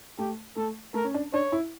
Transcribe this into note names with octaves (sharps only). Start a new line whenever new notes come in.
A3 G4
A3 A4
A3 A#4
C#4
D4
D4 C#5
E4